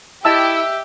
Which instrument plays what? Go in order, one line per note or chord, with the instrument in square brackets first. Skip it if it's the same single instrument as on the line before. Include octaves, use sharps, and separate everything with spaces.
[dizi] E4 [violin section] G4 [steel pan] D#5 A5 E6 [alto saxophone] E5